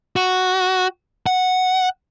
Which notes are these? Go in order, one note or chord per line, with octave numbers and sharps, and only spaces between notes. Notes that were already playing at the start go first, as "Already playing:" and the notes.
F#4
F#5